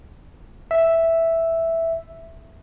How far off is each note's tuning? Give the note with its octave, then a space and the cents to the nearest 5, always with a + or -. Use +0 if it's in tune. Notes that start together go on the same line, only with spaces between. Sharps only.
E5 +0